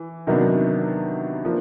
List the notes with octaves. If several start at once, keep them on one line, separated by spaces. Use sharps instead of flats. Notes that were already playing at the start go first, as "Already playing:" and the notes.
Already playing: E3
C3 D#3 F#3 B3 D4
F3 A#3 D4 F4